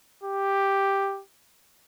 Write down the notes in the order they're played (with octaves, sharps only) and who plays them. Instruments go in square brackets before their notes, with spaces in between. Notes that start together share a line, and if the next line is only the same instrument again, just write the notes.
[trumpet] G4